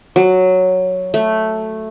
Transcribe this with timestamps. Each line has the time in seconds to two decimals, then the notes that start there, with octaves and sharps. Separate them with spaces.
0.16 F#3
1.14 A3